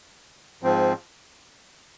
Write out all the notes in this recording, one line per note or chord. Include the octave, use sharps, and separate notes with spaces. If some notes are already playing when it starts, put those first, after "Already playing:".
G#2 F3 C4